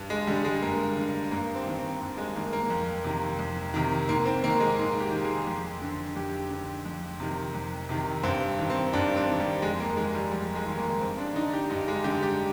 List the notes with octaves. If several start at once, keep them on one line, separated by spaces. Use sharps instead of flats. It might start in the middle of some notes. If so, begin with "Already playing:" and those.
Already playing: G2
G#3
D3 G3
G#3
G2 A#3
D3
G2 A#3
C4
D#3
C4
G2
G#3
D#3 A#3
A#3
F2
C3 D#3
F2
C3 D#3
G#2 A#3
C4
D#3 A#3
G#3
G#2
G4
D#3
G#4
F2
D3
F2 G4
D3
F2
C3 D#3
F2
C3 D#3
G2 C4
D#3
C4
G2 D4
C4
D#3
G3
F2 G#3
A#3
D#3 G#3
G3
F2 G3
G#3
D#3
A#3
G2 C4
D4
D3 D#4
G4
G2 D#4
G#3
D3 G4
G4